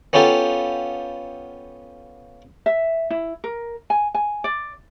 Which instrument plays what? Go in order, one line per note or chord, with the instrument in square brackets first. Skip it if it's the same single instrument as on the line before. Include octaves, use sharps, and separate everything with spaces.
[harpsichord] B3 C#4 F4 G4 A4 F5
[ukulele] E5
E4
A#4
G#5
G#5
D5